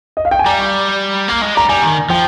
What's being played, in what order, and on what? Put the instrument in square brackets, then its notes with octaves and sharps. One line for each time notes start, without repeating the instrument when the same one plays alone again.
[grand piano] D#5
F5
G5
G#5
[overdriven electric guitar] G3 [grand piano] A#5
[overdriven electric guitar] A#3
G#3
[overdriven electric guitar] G3 [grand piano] A#5
[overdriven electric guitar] G3 [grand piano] G#5
[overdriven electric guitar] D#3
[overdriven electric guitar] F3 [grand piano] G5